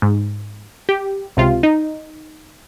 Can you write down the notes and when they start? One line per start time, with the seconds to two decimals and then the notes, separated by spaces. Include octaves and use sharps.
0.02 G#2
0.89 G4
1.37 C#2 C3 F4
1.63 D#4